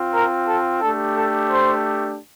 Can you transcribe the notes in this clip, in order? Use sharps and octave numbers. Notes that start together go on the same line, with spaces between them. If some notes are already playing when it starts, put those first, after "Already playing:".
Already playing: C4 F4
A#4
A4
A3 D4 G4 A4
A4
C5